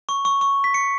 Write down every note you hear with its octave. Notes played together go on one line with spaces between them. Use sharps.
C#6
C#6
C#6
B6
C#7